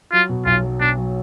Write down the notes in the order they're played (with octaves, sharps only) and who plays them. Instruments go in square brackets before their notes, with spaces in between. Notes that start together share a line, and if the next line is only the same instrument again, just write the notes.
[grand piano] F#3 [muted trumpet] F4
[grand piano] B2
[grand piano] B1 [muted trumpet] F4
[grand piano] F#3
[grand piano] B2 [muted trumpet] D4
[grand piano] F#3